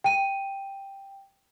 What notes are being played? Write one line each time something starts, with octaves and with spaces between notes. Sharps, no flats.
G5 D#7